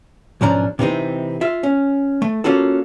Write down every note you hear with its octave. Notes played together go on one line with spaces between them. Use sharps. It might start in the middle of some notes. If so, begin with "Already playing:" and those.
B1 G#2 F3 C#4 D4 A#5
C3 E3 C4 D#4
F4 E5
C#4
A3
A#3 C#4 F4 F#4 A4